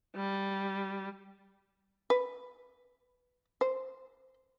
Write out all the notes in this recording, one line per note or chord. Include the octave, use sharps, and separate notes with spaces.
G3
B4
C5